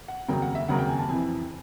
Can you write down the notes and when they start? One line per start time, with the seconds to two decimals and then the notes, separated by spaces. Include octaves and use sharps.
0.08 F#5
0.28 F1 D#2 C#3 F#3 A#3 G5
0.42 F#5
0.55 E5
0.68 F1 D#2 C#3 F#3 A#3 F#5
0.79 G5
0.89 G#5
0.99 A5
1.08 F2 C3 E3 G#5